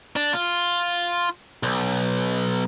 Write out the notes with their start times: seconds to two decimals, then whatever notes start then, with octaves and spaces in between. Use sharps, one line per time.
0.16 D4
0.33 F4
1.63 B1